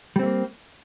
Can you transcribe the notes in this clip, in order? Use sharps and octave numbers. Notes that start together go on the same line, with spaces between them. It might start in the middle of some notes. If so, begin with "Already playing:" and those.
G3 A3 A#3 C4